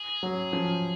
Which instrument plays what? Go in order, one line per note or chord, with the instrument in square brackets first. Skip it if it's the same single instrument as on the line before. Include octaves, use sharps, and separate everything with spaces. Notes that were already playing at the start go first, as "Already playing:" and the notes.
Already playing: [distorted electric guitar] G#4
[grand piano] F#3
F3